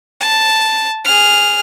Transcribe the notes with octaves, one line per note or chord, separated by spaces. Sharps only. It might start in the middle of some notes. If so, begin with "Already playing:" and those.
A5
G#4 F6